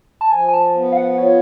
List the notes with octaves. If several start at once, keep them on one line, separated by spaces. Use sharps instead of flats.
A5
F3 G#5
G#5
A5
B3
F5
F#5
F4 C#5